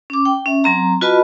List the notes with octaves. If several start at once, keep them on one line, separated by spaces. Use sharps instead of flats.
C#4 D6
G5
C#4 E5
F#3 C4 A#5
F4 F#4 B4 D#5 A5 B5